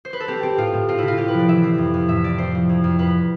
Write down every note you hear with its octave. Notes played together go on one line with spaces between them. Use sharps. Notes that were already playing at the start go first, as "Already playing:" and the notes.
C5
B4
A4
C4 G4
C4 G4
A2 F4
A2
C4 F4
C3 E4
F4
C3 G4
B4
F3 D5
E3 E5
C4
F2
F2
A2 E5
C4 D5
C4 C5
F3
F2
F2
F2 B4